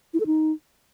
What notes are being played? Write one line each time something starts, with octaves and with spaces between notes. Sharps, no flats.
E4
A4
D#4